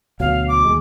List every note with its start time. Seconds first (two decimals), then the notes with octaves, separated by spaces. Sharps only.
0.20 D2 B2 F#3 F5
0.48 D6
0.65 D#2 G#3